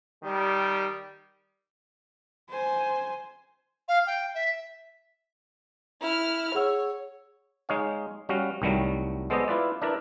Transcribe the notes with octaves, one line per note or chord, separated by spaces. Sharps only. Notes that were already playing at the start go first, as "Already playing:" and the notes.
D#3 G3
C5 G#5
F5
G5
E5
E4 F6
G#4 C#5 F#5 E6
G#3 D#4 C#5 F5
G3 C#4 F#4 F5
C2 D#3 F#3 G3 A3
G#3 B3 A4 C5 D5 D#5
E4 F4 B4 D5
D4 E4 A#4 B4 D5